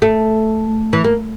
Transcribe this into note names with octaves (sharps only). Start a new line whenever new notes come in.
A3
E3
A#3